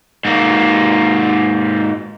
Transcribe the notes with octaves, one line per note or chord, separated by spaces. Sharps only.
G#2 A#3